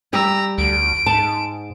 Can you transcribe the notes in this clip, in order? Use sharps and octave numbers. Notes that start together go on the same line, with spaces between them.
G3 G4 A#5 E6
D2 D7
G#2 A5